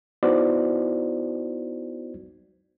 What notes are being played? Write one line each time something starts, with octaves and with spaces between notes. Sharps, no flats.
B3 D#4 E4 F#4 C5 D5